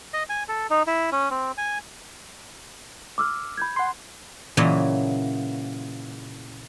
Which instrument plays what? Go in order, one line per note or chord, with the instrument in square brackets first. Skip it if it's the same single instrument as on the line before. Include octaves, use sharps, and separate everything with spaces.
[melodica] D#5
G#5
A4
D#4
E4
C#4
C4
G#5
[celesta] D6 E6 F6
B5 G6 G#6
[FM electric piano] F#5 C6
[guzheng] A#2 C#3 E3 F#3 C#5 D#5